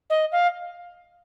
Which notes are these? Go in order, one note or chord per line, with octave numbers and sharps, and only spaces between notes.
D#5
F5